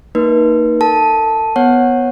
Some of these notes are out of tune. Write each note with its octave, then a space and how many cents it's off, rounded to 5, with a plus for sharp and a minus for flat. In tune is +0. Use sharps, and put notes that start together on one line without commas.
A#3 -25 D#4 +0 B4 -45
A4 +40 A5 -5
B3 +0 C#5 -20 F#5 +0